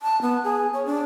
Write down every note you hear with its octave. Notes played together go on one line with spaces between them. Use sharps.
A5
B3
G#4
C#5
D4